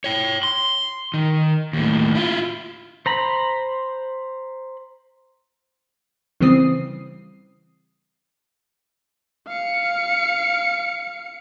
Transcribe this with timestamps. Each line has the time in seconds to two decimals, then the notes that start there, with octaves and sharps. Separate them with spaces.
0.04 C#5 G5
0.43 C6
1.14 D#3
1.73 D#2 A2
2.15 E4 F4
3.06 C5 A#5 B5
6.41 C#3 E3 G3 C4 D#6 C7
9.48 F5 C#7